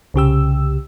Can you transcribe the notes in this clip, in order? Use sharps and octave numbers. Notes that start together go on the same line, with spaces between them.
C2 C#3 G4 E6